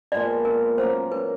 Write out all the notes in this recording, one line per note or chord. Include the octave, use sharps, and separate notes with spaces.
A#2 F3 G#3 B3 D5
A#4
F#3 A#3 C#4 C5
B4